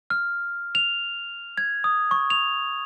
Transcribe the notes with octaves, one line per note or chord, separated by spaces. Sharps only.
F6
F7
G#6
D#6
C#6
F7